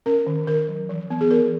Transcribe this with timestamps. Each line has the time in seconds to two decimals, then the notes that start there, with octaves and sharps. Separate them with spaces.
0.06 C#4 A#4
0.27 D#3
0.47 D#3 A#4
0.68 F#3
0.89 E3
1.10 B3
1.21 G#4
1.30 E3 A#4